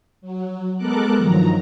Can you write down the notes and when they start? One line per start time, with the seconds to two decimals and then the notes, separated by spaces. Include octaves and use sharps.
0.21 F#3
0.76 G#3 B3 A4 A#4 D6 F#6
1.17 G2 D#3 F3 F#3 A#5